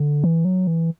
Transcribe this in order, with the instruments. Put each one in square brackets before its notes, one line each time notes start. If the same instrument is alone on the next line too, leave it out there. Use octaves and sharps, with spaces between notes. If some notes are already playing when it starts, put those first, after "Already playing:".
Already playing: [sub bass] D3
E3
F#3
E3